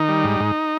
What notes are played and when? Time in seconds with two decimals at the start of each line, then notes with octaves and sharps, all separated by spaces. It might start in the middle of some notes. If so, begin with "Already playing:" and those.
Already playing: D#3 D#4
0.09 G3
0.24 G#2
0.40 G#2